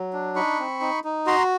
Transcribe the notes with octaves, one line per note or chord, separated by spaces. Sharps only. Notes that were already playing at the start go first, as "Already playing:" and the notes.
Already playing: F#3
D4
D#4 B5 C#6
C4
D#4
D#4
F#4 A#5 C6